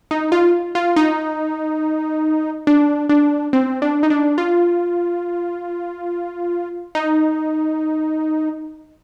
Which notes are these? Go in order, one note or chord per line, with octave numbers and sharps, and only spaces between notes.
D#4
F4
F4
D#4
D4
D4
C4
D4
D#4
D4
F4
D#4